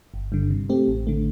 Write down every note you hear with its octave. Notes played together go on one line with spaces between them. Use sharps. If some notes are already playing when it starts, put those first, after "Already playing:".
G1
G2 D3
C3
A3 C4 G4
A1
D3 A3